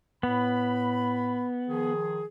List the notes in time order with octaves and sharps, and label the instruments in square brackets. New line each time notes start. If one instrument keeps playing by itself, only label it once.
[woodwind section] A2 B5 [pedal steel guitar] B3
[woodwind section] D#3 F3 G#4